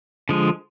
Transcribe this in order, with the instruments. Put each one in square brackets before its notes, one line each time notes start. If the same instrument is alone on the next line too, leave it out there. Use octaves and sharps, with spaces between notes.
[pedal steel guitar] D3 F3 G#3